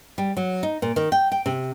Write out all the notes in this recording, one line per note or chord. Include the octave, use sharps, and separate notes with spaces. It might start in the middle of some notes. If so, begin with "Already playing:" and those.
G3
F#3
D#4
A#2
D#3
G5
G5
C3